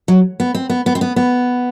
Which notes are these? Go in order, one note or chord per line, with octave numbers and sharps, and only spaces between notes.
F#3
B3
C4
B3
B3
C4
B3
B3